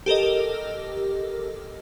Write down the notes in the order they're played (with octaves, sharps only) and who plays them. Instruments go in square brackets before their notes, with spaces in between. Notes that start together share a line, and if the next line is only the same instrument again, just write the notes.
[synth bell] G4 A4 A#4 D#5